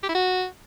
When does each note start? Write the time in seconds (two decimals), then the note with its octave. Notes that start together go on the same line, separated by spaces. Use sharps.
0.03 G4
0.09 E4
0.15 F#4